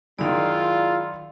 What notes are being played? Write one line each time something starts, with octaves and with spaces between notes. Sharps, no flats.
F#2 D#3 G#3 E4 F4 D5 F5 A#5